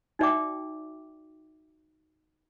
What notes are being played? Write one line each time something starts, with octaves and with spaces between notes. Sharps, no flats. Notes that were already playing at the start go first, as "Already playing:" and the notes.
D#4 F#4 D5 E5 G5 D6